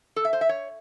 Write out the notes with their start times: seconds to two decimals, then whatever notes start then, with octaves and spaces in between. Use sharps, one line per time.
0.16 A4
0.25 E5
0.33 C5
0.41 E5
0.49 C#5